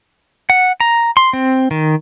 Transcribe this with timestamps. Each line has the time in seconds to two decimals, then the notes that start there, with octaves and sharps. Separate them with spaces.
0.50 F#5
0.80 A#5
1.17 C6
1.33 C4
1.71 D#3